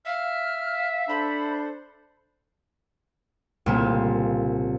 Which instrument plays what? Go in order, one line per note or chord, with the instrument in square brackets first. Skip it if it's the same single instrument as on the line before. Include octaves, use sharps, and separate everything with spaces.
[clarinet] E5 [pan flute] F5 [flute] F6
[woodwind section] D4 C5 [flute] A4 [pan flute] B5
[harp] C2 A#2 C#3 A3 A#3